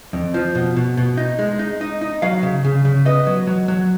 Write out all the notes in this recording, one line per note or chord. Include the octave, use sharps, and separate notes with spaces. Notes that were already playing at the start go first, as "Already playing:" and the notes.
F2
F3
B2
B2
B2
D#4
G#3
D#4
D#4
D#4
F#3 F5
C#3
C#3
C#3
B3 D#5
F#3
F#3
F#3